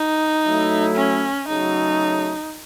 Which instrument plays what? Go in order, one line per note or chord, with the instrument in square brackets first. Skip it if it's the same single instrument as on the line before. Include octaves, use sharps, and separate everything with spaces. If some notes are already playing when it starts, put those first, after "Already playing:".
Already playing: [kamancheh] D#4
[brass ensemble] F#3 A3 E4
[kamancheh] C#4
[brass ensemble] C#3 F#3 A3 [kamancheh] D#4